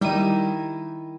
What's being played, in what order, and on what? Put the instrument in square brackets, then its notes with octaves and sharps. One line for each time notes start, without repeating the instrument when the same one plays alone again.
[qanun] D#3 D#4 E4 [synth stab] G3 D#7